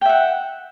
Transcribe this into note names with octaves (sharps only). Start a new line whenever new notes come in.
E5 F#5 G5